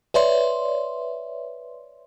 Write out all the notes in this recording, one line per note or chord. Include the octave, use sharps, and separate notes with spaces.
B4 C#5 D5 E5 C6